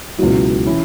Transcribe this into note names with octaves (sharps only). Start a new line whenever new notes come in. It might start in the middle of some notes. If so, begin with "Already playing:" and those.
C#2 B2 F#3 E4
E3 C#4 E4